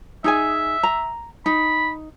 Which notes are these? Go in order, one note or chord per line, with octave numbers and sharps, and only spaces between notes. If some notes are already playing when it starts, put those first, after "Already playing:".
D#4 G#4 E5 G#5
A#5
D#4 B5